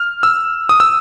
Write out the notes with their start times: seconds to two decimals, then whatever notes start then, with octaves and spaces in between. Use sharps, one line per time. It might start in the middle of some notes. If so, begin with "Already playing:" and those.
Already playing: F6
0.23 E6
0.69 D#6
0.80 E6